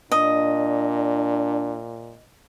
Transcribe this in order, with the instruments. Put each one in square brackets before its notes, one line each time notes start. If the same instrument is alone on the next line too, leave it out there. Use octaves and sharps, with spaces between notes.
[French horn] A#2 [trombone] D4 [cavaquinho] D#5